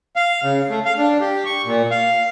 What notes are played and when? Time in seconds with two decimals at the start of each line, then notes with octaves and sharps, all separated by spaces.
0.16 F5
0.43 C#3
0.69 A3
0.85 F5
0.97 D4
1.21 G4
1.45 C#6
1.65 A#2
1.91 F5